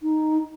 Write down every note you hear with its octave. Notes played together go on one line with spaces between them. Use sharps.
D#4